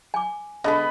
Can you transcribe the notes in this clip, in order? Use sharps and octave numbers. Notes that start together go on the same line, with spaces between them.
G#5 D6
D3 G#3 B3 A4 D#5 B5